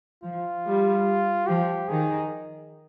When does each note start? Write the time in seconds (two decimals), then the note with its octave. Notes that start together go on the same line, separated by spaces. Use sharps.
0.24 F3 F4
0.65 G3
1.47 F3 G4
1.88 D#3 G#4